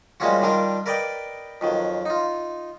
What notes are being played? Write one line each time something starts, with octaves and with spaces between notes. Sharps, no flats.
G3 G#3 A#3 C#4 F4 F#4
D#3 G3 D4 F4 A#4
A#4 B4 D5 D#5 G5
F2 D#3 F#3
D#4 F4